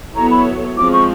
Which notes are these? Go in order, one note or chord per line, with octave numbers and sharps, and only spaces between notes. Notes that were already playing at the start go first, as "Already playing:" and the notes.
F#3 B3 E4 A4 C#5 A#5
B5
F3 G#3 C4 D6
C#6